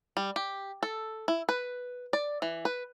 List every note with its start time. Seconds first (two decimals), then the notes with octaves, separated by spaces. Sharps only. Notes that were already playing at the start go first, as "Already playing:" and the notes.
0.17 G3
0.36 G4
0.83 A4
1.28 E4
1.49 B4
2.13 D5
2.42 E3
2.65 B4